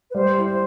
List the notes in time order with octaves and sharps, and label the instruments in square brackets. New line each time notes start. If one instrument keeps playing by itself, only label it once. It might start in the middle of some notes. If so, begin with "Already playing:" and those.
[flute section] B4
[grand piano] G3 [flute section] C5
[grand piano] E4
[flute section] C5